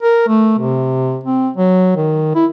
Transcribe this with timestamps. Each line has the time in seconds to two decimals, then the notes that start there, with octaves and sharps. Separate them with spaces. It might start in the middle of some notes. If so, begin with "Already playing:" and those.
0.02 A#4
0.28 A3
0.59 C3
1.23 C4
1.57 F#3
1.96 D#3
2.35 E4